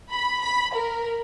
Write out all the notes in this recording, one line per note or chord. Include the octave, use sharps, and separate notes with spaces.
B5
B5
A#4